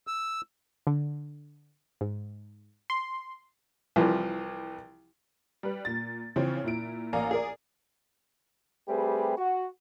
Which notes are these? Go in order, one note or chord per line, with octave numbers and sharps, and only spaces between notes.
E6
D3
G#2
C6
C2 E3 F3
G3 B4
A#2 A6
C#3 E3 F3 C4 C#4
A#2 E4 D7
A1 A#3 D5 F5 G#5 A#5
G#4 A#4 D5
G3 A3 C4 G4 G#4 B4
F#4